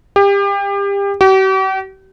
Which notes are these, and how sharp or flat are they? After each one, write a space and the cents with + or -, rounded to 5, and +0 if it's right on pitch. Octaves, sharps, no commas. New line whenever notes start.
G4 +30
G4 -45